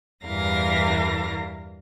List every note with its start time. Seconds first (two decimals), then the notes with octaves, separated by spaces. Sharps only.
0.23 E2 G2 E3 A#4 F5 A#6